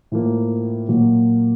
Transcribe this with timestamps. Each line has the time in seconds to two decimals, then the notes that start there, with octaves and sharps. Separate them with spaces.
0.12 A2 F3 A#3
0.88 A#2 F#3 A#3